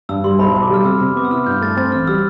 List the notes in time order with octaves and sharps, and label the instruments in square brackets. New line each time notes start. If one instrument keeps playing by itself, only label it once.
[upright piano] G2 [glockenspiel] E6
[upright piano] G3 [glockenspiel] C6
[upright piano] B1 [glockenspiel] B5
[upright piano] B1
[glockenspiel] D6
[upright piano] G3 [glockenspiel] F6
[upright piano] C3 [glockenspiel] E6
[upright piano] C3
[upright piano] B3 [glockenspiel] D6
[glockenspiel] E6
[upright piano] E4 [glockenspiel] F6
[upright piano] G2 [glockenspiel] G6
[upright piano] A3 [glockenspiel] A6
[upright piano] C4 [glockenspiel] A6
[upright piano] A1 [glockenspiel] F6
[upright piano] G3 [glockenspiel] E6